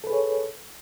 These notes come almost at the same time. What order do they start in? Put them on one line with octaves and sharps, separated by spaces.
A4 B4 G#4 C#5